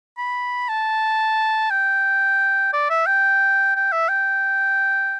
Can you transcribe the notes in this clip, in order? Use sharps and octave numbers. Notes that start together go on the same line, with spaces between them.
B5
A5
G5
D5
E5
G5
G5
E5
G5